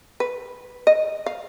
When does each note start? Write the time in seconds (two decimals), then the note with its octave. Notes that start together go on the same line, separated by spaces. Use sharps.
0.20 B4
0.87 D#5
1.26 F5